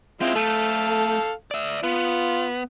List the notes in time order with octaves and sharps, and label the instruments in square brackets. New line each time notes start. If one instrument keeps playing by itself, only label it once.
[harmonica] G#3 E4 F4 [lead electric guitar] C4
[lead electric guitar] A3 [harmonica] A4 F5
[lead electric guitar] D5 E5
[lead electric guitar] B3 [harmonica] F4